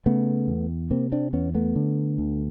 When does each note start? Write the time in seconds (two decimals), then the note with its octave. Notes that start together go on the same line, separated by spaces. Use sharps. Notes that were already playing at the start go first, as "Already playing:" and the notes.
0.06 C#3 A3 B3
0.48 E2
0.91 C3 A#3 C4
1.12 C4 D4
1.33 E2 B3 C#4
1.54 A3 B3
1.76 D3
2.18 D2